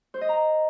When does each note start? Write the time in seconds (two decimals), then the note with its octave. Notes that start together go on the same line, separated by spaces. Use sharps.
0.14 C5
0.21 D#5
0.29 A#5